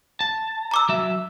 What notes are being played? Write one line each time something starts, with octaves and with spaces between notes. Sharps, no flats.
A5
A#5 D6 E6
F#3 E5